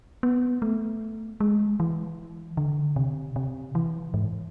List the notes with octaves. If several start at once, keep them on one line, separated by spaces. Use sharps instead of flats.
B3
A3
G#3
E3
D3
C3
C3
E3
G#2